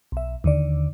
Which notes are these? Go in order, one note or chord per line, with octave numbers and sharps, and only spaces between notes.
B1 E5
D#2 D3 D5